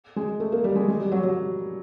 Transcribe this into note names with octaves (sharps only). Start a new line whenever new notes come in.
G#3
A3
A#3
G3
G#3
G#3
G3
F#3
F#3